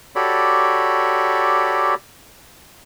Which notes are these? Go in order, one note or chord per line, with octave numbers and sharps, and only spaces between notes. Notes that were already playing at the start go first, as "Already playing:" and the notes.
F#4 G4 A4 C#5 D5 B5